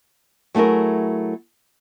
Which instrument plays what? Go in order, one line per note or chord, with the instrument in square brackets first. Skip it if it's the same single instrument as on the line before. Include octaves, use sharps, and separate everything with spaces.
[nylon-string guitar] F#3 A3 E4 G#4 A#4